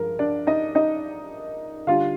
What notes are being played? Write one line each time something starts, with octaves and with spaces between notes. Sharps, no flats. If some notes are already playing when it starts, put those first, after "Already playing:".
Already playing: G2 F3 G#3 A#4
D4 D5
D#4 D#5
D#4 D#5
D3 G3 D4 F4 F5